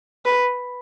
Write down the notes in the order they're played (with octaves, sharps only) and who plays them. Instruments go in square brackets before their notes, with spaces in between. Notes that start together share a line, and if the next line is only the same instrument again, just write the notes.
[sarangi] B4